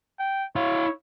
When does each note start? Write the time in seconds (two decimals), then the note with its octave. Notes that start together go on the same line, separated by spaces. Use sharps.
0.19 G5
0.56 E4 C#5 F5